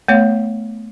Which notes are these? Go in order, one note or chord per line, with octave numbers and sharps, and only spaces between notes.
A3 B3 C#5 F5